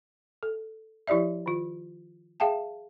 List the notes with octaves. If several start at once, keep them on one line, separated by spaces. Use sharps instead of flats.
A4
F3 E4 G4 D5 E5
D#3 F4
G#4 E5 F5 G5 A5